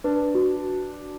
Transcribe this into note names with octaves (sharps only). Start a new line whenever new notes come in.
D4 B4
F#4